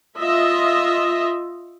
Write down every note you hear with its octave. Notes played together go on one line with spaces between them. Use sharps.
F4 D#5 E5